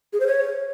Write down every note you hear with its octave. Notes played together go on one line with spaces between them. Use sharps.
G#4
C5
C#5